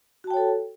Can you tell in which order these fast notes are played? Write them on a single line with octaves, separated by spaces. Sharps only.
F#4 A5 G5 C#5 A4